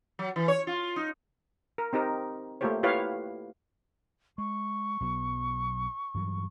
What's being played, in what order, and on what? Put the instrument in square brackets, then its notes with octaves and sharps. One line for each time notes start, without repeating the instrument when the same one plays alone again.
[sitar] F#3
E3
C#5
F4
D#4
[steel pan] A#4
C4 D#4 G4 A#4
A3 A#3 F4 G4 C5 C#5
E4 F4 G4 B4 C#5 F5
[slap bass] G#3 [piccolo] C#6
[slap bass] B1 F#3 B3
G2 E3 F#3